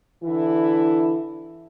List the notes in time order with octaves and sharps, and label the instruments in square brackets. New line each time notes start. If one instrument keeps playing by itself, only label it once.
[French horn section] D3 E3 E4